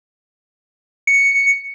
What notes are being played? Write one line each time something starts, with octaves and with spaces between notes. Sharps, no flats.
C#7